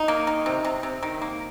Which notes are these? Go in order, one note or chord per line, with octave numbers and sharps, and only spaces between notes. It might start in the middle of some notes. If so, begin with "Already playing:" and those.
Already playing: D#4
A#3
D#3
C3
C3
C3
D#3
A#3